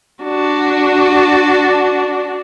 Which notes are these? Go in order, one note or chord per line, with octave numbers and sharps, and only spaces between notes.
D4 F#4